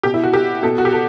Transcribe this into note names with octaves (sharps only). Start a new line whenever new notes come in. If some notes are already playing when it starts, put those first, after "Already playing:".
B2 G4
E4
F#4
G4
B2 A4
F#4
G4
A4